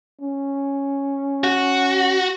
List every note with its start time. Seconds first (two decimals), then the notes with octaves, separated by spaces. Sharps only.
0.21 C#4
1.44 F#4